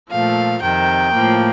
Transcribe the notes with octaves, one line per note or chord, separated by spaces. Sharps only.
A#2 F3 A3 F5
F2 C3 D#3 G5
A2 F3 A#3